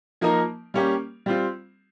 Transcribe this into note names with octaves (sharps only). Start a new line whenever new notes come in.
F3 A#3 D#4 A#4
G3 A#3 C#4 G4
G3 C4 F4